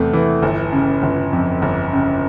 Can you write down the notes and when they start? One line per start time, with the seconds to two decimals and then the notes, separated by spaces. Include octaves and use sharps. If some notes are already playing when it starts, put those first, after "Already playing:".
Already playing: E2 C3 A3
0.13 E3
0.42 G1
0.72 C#3
1.03 G1
1.33 F2
1.62 G1
1.92 C#3